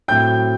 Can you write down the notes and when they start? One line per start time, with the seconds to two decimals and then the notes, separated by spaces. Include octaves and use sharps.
0.08 A2 F#3 C4 G5 G6